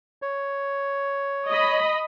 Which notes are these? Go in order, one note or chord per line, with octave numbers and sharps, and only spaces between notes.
C#5
D#5 B5